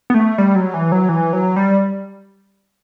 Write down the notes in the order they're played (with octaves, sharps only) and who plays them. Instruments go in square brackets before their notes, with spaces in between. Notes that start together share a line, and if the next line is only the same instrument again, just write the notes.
[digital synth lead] B3
A3
G3
F#3
E3
F#3
E3
F#3
G3